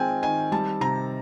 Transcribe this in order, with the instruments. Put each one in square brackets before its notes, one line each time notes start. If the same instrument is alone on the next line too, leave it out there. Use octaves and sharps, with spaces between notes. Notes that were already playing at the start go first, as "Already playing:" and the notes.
Already playing: [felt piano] D#3 G#3 C4 F4 G5 G#5
D#3 G#5
G3 A5
C3 A#5